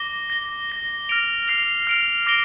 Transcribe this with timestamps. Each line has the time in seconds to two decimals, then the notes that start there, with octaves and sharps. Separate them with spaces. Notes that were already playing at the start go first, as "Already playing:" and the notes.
Already playing: D6 A#6 G7
0.30 A#6 G7
0.70 A#6 G7
1.09 F6 A#6 D7 F7
1.48 F6 C7 F7
1.87 F6 D7 F7
2.26 D6 A#6 D7 G7